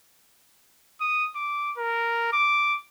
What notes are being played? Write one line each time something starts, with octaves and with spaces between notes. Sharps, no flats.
D#6
D6
A#4
D6